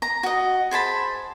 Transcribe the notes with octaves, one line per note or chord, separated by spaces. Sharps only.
A#5
F#4 D#5
G#4 C5 A5 B5